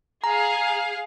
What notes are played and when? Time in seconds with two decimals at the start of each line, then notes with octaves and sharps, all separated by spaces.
0.24 G#4 F5 A#5